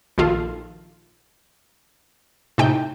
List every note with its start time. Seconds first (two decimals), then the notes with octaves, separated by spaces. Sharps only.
0.18 A#1 D#3 F4 A4
2.58 A2 C3 D#4 G5